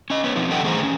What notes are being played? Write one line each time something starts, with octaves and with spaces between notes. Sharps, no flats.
C#4 D#5
B3 C#4
F2 F3 C4 D#4
D3 C#4 A4 D#5 F#5 G5
E3 A3 G#4 C5 A#5
D#3 C#4